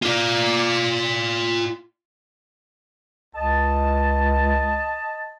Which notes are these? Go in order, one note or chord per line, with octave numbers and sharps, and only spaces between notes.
F4 D5
C#2 D#5 A5